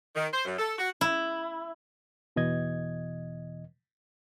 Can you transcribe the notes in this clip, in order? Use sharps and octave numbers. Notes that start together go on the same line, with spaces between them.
D#3
C5
F#2
A4
F#4
E4
E2 B2 E3 D#5 G#6